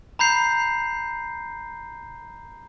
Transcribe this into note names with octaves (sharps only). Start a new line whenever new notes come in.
A#5 B5 G6 C7